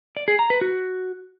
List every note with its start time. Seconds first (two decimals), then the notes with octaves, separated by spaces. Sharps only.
0.17 D5
0.28 G#4
0.39 A#5
0.50 B4
0.61 F#4